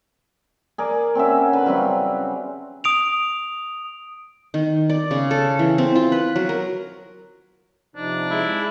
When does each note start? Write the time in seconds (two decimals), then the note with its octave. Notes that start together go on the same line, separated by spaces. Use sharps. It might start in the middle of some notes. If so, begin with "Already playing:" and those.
0.78 G#4 A#4 D5
1.15 C4 C#4 F#4 E5
1.53 D3 B4 B5
1.66 C#3 F#3 G3 C4
2.84 D#6 D7 F7
4.54 D#3
4.90 D5
5.11 C#3
5.31 A4
5.59 E3
5.78 C4
5.95 F4
6.12 B4
6.36 F#3
6.49 A#4
7.96 C3 F3 D4 D#4
8.31 G#3 E4 G#4